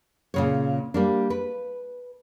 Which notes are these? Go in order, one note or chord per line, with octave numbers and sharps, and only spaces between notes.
A#2 C#3 C#5
G3 A#3 D4
B4